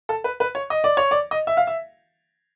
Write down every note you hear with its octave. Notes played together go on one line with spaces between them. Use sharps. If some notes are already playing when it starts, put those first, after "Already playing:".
A4
B4
B4
C#5
D#5
D5
C#5
D5
D#5
E5
F5
E5